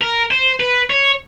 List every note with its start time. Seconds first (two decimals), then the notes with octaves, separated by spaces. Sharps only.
0.01 A#4
0.31 C5
0.60 B4
0.90 C#5